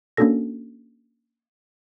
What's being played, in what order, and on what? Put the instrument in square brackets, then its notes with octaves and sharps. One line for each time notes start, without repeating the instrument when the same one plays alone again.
[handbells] A#3 C#4 D4 F#4 A4 A#6